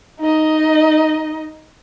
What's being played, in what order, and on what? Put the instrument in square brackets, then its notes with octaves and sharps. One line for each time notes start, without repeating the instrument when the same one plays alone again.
[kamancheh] D#4 D#5